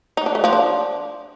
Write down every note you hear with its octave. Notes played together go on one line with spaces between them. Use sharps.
D#4
D4
A3
F3
D4